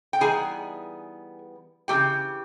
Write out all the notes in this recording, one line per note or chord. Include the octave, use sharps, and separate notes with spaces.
G5
E3 G3 B3 D#4 G#4 G#5
C#3 E3 A3 C#4 G4 G5